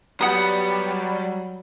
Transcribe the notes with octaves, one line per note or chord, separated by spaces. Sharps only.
F#3 G3 B3 F#5 D#6